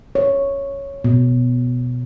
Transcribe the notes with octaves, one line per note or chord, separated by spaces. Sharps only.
C#5
B2